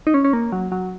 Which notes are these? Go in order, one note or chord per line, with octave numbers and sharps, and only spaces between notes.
D#4
C#4
C#4
A#3
F#3
F#3